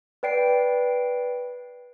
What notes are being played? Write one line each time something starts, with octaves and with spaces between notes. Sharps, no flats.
B4 D5 G5 C7 D7